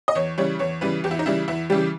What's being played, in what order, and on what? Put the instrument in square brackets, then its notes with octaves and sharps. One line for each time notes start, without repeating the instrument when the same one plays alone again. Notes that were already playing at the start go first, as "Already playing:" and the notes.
[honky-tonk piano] D#5
E2 C#5
C#3 E3 G3 C#5
E2 C#5
C#3 E3 G3 B4
E2 G4
E4
D#4
C#3 E3 G3 E4
E2 E4
C#3 E3 G3 G4